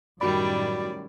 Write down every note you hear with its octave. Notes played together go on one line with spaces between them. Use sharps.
F#2 A2 D#3 G3 F#4 D5 B5